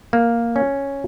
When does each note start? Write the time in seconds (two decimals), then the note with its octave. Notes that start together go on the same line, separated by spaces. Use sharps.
0.13 A#3
0.56 C#4